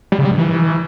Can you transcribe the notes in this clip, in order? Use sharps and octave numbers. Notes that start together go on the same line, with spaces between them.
G3
C#3
G3
G2
E3